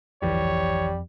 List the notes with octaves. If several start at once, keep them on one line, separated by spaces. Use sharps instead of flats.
G1 C2 F2 E3 G3 C#5